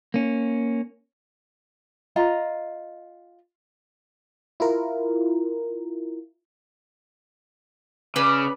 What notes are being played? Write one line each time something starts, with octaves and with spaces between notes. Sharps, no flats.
A#3 C#4
F4 D#5 A#5
E4 F4 A#4
C#3 B4 D5